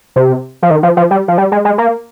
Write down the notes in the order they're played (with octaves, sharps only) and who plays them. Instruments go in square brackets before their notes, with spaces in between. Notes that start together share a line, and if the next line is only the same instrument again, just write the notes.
[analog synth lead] C3
F3
D#3
F3
F3
G3
F3
G3
G#3
G#3
A#3